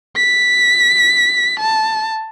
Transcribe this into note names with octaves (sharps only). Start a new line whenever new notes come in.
B6
A5